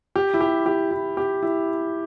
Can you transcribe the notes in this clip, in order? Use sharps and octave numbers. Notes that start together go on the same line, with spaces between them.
G4
E4
G4
G4
E4
G4
E4